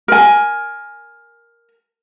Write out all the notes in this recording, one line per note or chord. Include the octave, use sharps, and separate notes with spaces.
A#4 G#5